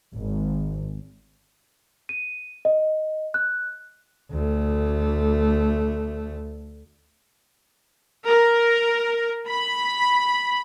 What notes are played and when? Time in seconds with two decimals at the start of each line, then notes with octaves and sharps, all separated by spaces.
0.11 G#1
2.09 D#7
2.65 D#5
3.34 F#6
4.31 D2 A3
8.27 A#4
9.49 B5